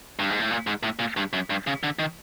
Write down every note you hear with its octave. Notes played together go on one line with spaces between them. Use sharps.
G2
G#2
A2
A#2
G#2
A2
A#2
G2
F#2
G2
C#3
D3
D#3